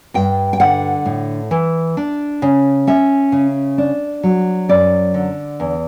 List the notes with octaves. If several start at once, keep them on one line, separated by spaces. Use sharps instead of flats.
G2 G5
G5
D3 F#5
A2
E3
D4
C#3
C#4 E5
C#3
D4
F#3
F#2 D5
D3
E2